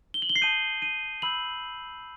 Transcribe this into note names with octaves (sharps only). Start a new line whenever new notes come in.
G7
F#7
G7
C7
A5 D#6 G6 D#7
D#7
B5 E6 G6 F#7